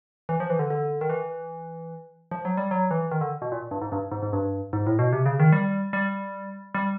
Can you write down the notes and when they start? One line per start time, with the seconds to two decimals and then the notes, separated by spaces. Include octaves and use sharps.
0.29 E3
0.40 F3
0.50 E3
0.59 D3
0.70 D3
1.01 D#3
1.10 E3
2.31 F3
2.45 F#3
2.57 G3
2.71 F#3
2.91 E3
3.11 D#3
3.21 D3
3.42 B2
3.52 A#2
3.71 G2
3.82 G#2
3.92 G2
4.12 G#2
4.23 G#2
4.33 G2
4.73 G#2
4.87 A2
4.99 B2
5.13 C3
5.26 C#3
5.40 D#3
5.52 G3
5.93 G3
6.74 G3